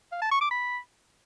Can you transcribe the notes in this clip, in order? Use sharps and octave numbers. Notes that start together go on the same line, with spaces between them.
F5
A5
C#6
D6
B5